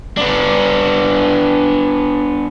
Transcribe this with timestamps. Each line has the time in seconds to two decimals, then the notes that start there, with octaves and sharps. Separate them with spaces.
0.17 B3 D4